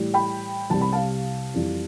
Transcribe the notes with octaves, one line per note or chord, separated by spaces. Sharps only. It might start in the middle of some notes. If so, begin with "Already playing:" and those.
Already playing: A2 E3 G3
G5 B5
C2 C3 G3 A5
B5
F5 A5
F2 E3 G3